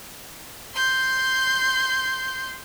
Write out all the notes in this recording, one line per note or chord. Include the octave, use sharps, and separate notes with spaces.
C6 G6